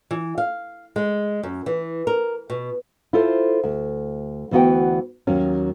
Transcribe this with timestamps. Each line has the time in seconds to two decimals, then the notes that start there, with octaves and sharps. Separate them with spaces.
0.11 E3
0.38 F5
0.96 G#3
1.43 F#2
1.66 E3
2.07 A#4
2.50 B2
3.13 E4 F4 A4 C5
3.63 D2
4.51 D2 E3 B3 F#4 F#5 G5
5.27 D#2 F#3 C#4